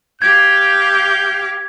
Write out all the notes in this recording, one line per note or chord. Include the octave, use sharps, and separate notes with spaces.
G4 F5 G6 G#6